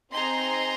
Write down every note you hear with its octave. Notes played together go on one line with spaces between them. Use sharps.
C4 D#4 G#4 A#5 C6